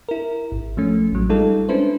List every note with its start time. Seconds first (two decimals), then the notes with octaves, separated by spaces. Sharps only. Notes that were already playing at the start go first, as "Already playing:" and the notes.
0.09 E4 A#4
0.52 G#1
0.77 F3 A3 C#4
1.12 A1 F#3
1.29 G3 G#3 D#4 F4 A4
1.69 C#4 D4 E4 B4 C5